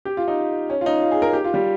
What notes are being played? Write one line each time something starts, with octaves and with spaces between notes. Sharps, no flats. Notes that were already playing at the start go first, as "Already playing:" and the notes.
G4
F4
D#4
C#4
F4
D#4
F4
G#4
A#4
G4
F4
G3